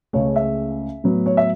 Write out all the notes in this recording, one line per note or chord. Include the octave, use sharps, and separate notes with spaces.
C#2 C#3 A3 C#5
E5
A2 F#3 B3
C#5
E5